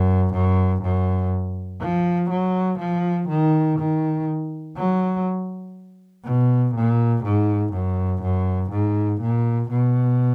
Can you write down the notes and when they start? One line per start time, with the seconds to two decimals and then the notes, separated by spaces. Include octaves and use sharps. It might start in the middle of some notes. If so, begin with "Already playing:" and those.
Already playing: F#2
0.34 F#2
0.82 F#2
1.81 F3
2.31 F#3
2.79 F3
3.29 D#3
3.79 D#3
4.77 F#3
6.25 B2
6.75 A#2
7.24 G#2
7.73 F#2
8.22 F#2
8.72 G#2
9.22 A#2
9.70 B2